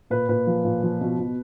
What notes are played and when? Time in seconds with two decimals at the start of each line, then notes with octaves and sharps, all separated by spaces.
0.10 A#2 B4
0.29 A#2 B4
0.47 F3
0.65 A#2
0.83 F3
1.01 B2
1.19 B2